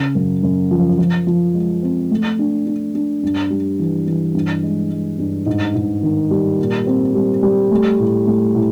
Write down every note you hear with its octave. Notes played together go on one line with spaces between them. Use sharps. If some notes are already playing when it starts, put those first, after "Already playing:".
Already playing: C#3
F#2
F#2
F3
F3
F3
G#3
C4
A3
D4
D4
D4
G2
G3
E3
E3
G2
G#3
G#3
G2
G#2
G#2
D#3
G3
A#2
C4
G3
G3
A3
A2
A3
A2